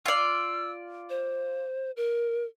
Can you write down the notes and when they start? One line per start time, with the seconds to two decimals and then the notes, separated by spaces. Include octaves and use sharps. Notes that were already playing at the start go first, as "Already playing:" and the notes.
0.06 F4 D5 E6
1.10 C5
1.97 A#4